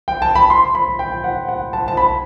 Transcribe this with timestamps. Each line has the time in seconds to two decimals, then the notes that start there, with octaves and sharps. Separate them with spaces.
0.08 G5
0.22 A5
0.35 B5
0.50 C6
0.75 B5
0.99 G5
1.24 F#5
1.48 F#5
1.73 A5
1.88 A5
1.97 B5